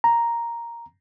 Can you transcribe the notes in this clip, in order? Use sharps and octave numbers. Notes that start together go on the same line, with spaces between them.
A#5